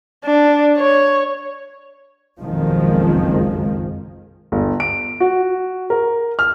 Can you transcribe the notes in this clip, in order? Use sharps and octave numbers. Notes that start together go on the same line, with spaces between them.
D4
C#5
F#1 B1 F2 D#3 F3 G#3
G1
D7
F#4
A#4
F6